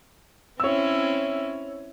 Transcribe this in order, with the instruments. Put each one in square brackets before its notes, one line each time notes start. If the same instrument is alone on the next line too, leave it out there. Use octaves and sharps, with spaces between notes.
[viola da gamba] C4 C#4 E4 [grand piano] C#5 E6